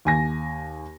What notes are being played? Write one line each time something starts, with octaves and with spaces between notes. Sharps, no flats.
D#2 G#5 A#6